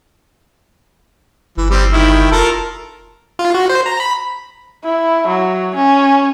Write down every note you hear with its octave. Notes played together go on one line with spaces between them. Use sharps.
G1 E3
G3 C4
D#3 E4 G4
F1 F4 A4 A#4
F4
F#4
C5
A#5
B5
E4
F#3
C#4